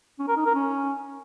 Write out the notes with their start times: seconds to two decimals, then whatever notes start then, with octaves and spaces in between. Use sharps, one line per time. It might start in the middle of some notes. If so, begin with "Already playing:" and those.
0.19 C#4
0.28 A#4
0.37 D#4
0.46 A#4
0.55 C#4